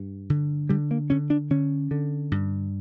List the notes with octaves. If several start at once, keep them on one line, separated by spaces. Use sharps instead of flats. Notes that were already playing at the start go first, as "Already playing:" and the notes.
Already playing: G2
D3
D3 G3
A#3
D3 C#4
D4
D3 C#4
D3
G2